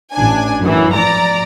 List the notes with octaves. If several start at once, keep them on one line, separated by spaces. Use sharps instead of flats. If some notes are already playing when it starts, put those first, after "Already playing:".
A1 D4 G#5
F#2 A2 E3
F3 D5 A#5